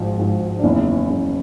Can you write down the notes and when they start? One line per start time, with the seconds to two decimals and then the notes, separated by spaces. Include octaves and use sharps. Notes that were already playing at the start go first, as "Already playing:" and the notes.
Already playing: G#1 G#2 F3
0.17 G#1 G#2 F3
0.59 D4
0.63 F#1 E2 C#3 D#4
1.09 F#1 E2 C#3